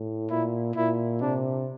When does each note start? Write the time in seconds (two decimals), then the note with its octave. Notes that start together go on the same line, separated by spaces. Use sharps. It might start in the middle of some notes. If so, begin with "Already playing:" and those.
Already playing: A2
0.30 A#2 E4
0.76 A#2 E4
1.21 C3 D4